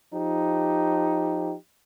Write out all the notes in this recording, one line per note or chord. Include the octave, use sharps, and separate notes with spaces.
F3 D#4 G4